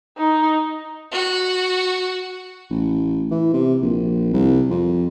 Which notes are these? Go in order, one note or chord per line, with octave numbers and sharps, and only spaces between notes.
D#4
F#4
A1
E3
C3
A#1
C2
F2